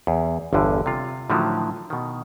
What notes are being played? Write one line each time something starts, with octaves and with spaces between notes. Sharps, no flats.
E2
G1 E2 G2 D3
C3 F4
A2 D3 D#3 F3 F#3
B2 D#3